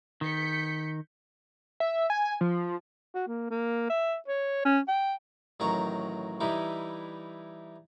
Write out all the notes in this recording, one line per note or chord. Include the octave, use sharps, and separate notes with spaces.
D#3 G6 B6 C#7
E5
G#5
F3
F#4
A#3
A#3
E5
C#5
C#4
G5
A1 D#3 F#3 A5 A#5 C#6
E3 G3 D#4 E4